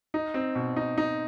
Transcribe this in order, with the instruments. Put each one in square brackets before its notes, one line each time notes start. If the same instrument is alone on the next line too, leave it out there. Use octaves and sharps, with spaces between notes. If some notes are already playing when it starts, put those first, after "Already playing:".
[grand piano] D#4
C4
B2
D#4
D#4